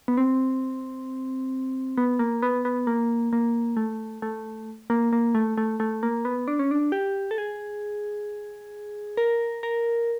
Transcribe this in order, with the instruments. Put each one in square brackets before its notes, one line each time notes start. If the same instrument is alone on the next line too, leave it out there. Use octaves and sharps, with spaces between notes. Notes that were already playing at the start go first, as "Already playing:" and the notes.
[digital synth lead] B3
C4
B3
A#3
B3
B3
A#3
A#3
A3
A3
A#3
A#3
A3
A3
A3
A#3
B3
D4
C#4
D4
G4
A4
G#4
A#4
A#4